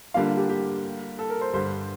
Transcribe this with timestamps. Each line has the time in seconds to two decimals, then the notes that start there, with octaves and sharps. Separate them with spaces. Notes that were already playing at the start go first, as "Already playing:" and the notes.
0.14 D3 G3 A#3 D4 F4 F5
0.37 G4
0.49 G4
1.19 A4
1.30 A#4
1.41 C5
1.53 G2 D3 G3 C5